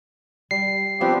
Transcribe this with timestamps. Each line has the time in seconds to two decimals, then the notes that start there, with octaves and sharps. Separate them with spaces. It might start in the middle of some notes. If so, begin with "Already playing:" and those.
0.51 G3 C7
1.01 F3 B3 C4 D4 G4